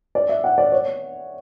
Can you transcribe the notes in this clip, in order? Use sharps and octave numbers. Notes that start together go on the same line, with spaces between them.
D5
E5
F#5
D5
C#5